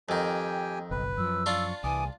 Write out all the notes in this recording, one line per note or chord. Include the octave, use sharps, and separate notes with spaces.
F2 D#3 G4 G5 G#5
F#1 B1 B4
F#2 F3 E6
D4 F4 C#6
C2 E3 G#5 D6 D#6